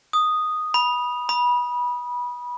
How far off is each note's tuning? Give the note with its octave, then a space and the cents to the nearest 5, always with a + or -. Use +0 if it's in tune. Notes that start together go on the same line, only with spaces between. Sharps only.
D#6 -5
B5 -20
B5 -25